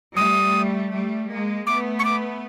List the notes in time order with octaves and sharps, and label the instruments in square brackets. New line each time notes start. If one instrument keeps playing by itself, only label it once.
[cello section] G3 A3 [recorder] D#6
[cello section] G3 A3
G#3 A#3
[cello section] A3 B3 [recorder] D6
[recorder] C#6
D6